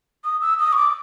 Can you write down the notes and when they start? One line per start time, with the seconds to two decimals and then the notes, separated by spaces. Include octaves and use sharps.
0.24 D#6
0.42 E6
0.59 D#6
0.73 C#6
0.77 D6